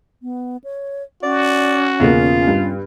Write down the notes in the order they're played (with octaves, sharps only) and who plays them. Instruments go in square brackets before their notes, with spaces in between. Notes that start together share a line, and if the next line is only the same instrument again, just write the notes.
[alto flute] B3
C#5
[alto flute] C#4 [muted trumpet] F#4 [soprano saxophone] D5
[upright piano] E1 C#3 A#3 [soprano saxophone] F4
[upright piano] G2